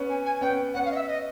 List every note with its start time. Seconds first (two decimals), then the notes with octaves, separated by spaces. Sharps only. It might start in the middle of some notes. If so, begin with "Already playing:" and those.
Already playing: B3 C#4
0.09 G#5
0.25 G#5
0.41 B3 C#4 G5
0.74 B3 C#4 F#5
0.85 F5
0.91 D#5
0.95 E5
1.07 D#5